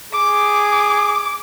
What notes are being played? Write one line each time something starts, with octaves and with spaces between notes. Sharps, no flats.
G#4 D6